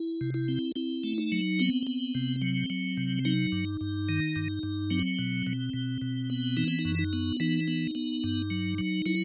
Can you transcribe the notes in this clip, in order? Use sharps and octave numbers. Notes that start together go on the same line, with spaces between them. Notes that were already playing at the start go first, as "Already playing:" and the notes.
Already playing: E4
C3
E4
C4
C4 E4
A3
D#4
F#3
B3 C4
B3
C3
F#3
F#3
C3
F#3 D#4
G2
G2
D#3
G2
G2
F#3 C4
B2
B2
B2
B2
B3
E3 D#4
C4
D#4
F#2
D#4
B3
E3 D#4
B3
B3
G2
F#3
F#3
F#3 E4